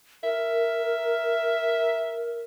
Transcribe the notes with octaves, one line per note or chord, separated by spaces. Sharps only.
A#4 E5